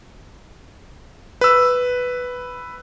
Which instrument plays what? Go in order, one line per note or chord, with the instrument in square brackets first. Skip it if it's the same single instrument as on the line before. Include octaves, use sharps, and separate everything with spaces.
[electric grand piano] B4 E6